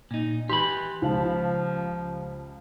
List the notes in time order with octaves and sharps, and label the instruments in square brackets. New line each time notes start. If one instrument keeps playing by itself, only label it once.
[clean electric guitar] A#2 D#4
[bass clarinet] E3 [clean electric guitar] G4 B5 [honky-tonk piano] C6
[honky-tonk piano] C#2 F5 A5 [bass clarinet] F3